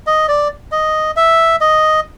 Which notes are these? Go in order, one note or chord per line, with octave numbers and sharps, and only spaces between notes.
D#5
D5
D#5
E5
D#5